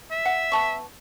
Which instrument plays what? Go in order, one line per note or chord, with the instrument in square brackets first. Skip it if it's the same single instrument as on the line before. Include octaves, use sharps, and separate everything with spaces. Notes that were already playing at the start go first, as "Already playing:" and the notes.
[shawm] E5
[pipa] F#5
B3 A5 C#6